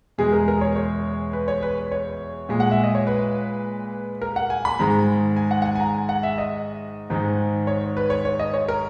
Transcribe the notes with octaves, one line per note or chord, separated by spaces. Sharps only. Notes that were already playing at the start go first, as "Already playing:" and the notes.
E2 B2 G#3 G#4
A#4
A#4
C#5
C#5
B4
C#5
B4
C#5
A#2 G#3
F#5
E5
D#5
C#5
B4
A#4
F#5
G#5
B5
G#2 D#3 G#3 A#5
G#5
F#5
F#5
G#5
G#5
A#5
F#5
E5
D#5
G#2 D#3 G#3
C#5
B4
C#5
C#5
D#5
C#5
A#4